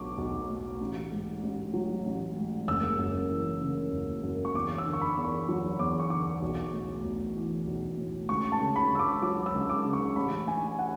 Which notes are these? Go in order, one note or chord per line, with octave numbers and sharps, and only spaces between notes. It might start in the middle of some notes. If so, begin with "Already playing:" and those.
Already playing: B1 A2 F#3 C#6 D6
B1
A2
A1
G#2
A1
F#3
A1
G#2
F#1 E6
F#2
E3
C#3
F#1
F#2
C#6
E2 D6
E6
D3
C#6
B5
E2
C#6
F#3
E2 D6
C#6
D3 D6
B1
A2
B1
E3
B1
A2
C#2 C#6
A5
C#3
B5
C#2 E6
D6
F#3 D6
E6
C#2
D6
C#3
C#6
A1 B5
A2 G#5
F#5